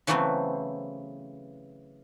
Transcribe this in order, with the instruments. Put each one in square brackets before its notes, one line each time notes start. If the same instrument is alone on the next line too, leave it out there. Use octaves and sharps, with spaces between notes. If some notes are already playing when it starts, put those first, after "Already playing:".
[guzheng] C#3 E3 F#3 A3 B3 C4